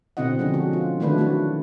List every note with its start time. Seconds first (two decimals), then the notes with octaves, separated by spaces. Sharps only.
0.17 B2 D3 C4 E4 D#5 F#5
0.39 D3 F3 G#3 C#4 D4
0.54 F#4
0.73 F4
1.00 D#3 F#3 A3 D4 E4 B4
1.18 A3 D4 F#4